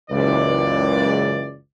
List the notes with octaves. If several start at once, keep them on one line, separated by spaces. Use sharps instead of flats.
F#1 C#2 E3 D5